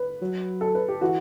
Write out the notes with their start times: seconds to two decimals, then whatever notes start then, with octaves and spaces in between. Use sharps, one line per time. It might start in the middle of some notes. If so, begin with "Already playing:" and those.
Already playing: B4
0.21 F#3
0.61 A4
0.75 B4
0.88 G4
1.01 E3 F#4